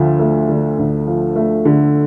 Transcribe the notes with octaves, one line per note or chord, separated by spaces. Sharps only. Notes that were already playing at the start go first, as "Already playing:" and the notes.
Already playing: D2 D3 F3 A3
A3
D3
D2
F3
A3
D3